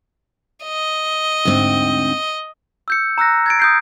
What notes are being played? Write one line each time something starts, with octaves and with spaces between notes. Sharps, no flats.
D#5
D2 G#2 C4
E6 G6 C#7
A#5 E6 F#6 A#6
G#6 A6 D7
D#6 G6 C7